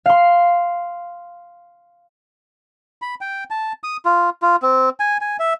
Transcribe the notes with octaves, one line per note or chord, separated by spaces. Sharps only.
F5 C6
B5
G5
A5
D#6
F4
F4
C4
G#5
G#5
E5